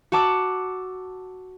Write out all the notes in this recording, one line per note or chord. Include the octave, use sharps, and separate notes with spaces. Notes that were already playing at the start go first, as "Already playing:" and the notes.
F#4 F#5 A5 D6 E6